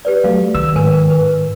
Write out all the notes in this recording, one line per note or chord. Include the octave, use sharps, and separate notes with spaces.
G4 B4 D5
F#3 A3 F5
D#3 E6
G#2 A#4 B4 G#5
B4